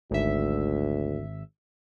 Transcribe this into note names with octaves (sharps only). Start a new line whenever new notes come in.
G#1 D2 E5